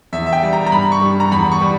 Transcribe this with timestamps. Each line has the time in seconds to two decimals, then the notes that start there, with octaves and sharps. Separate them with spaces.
0.13 E2 E5
0.26 E5
0.33 G5
0.43 G3
0.53 A#5
0.66 A#5
0.72 G2 B5
0.92 C#6
1.01 G3
1.20 A#5
1.31 E2 B5
1.52 C#6
1.61 G3